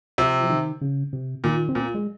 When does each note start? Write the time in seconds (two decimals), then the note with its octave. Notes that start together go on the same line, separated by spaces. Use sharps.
0.18 C3 F3
0.44 F3
0.50 D#3
0.81 C#3
1.13 C3
1.44 A#2 D#3
1.69 C4
1.75 A#2
1.82 A#3
1.94 G#3